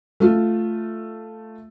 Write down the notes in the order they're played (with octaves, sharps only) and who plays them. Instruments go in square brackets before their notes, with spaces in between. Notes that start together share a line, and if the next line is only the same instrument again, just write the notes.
[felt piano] A3 F4